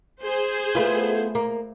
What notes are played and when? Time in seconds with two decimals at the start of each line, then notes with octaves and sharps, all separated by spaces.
0.22 G#4 C5
0.75 A3 B3 F4
1.35 A#3